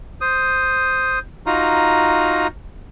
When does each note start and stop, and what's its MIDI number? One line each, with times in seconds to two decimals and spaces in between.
0.21 1.19 72
0.21 1.19 87
1.46 2.47 63
1.46 2.47 65
1.46 2.47 66
1.46 2.47 82